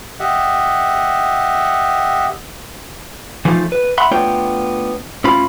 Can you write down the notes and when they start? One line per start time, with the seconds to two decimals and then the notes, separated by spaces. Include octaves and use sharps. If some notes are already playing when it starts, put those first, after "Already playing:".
0.20 G4 D#5 E5 F#5
3.45 E3 F3 A3 D#4 F4
3.72 B4
3.98 E5 F#5 B5 C6
4.11 A3 B3 D4 F4 C#5 G5
5.24 A2 C#4 F4 B5